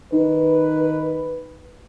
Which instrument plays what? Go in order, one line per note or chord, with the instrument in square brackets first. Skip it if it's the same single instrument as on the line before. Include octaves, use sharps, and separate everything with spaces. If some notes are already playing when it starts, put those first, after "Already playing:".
[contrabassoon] D#3 [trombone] B4